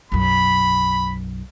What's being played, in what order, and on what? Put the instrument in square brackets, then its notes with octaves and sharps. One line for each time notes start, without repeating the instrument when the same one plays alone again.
[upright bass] B1 F#2 [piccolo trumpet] B5